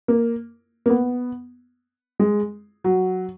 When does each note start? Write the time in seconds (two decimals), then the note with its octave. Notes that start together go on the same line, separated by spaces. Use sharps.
0.08 A#3
0.86 A#3
0.89 B3
2.20 G#3
2.84 F#3